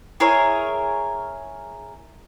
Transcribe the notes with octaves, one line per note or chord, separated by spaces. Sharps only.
E4 G#4 A#4 C#5